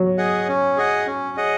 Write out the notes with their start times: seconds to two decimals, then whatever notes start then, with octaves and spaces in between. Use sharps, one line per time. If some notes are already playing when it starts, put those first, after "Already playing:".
Already playing: F#3
0.18 G#4 D#5 F#5
0.48 C#4
0.77 G#4 D#5 F#5
1.07 C#4
1.37 G#4 D#5 F#5